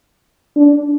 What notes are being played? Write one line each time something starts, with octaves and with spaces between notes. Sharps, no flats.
D4